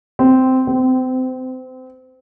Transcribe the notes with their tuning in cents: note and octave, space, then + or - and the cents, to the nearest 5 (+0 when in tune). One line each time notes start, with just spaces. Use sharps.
C4 -10
C4 -30